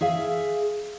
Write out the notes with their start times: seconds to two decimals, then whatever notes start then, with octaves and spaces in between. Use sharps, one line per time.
0.01 G#4 E5 F5